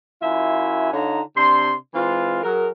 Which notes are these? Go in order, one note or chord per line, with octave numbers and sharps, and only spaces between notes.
F#2 E4 F4 E5 G#5
D3 D#4 F4 C#5 A#5
C3 D4 C6
E3 G#3 C4 F4
F#3 G#4 A#4